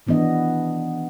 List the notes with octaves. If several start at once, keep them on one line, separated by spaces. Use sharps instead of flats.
D#3 E3 B3 D4 D#5